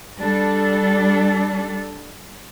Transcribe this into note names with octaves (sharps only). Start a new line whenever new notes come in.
G3 D4 A4